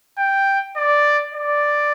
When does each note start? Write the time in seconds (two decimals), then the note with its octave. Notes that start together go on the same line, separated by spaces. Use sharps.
0.18 G5
0.77 D5
1.35 D5